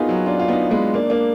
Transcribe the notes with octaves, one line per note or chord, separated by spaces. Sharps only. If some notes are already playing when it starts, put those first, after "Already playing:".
Already playing: B3 D#4 F4 F#4 G#4 A#4
F#3
D4 F4
F4
B3 D#4
G#3 B3
A#3 D4
A#3 D4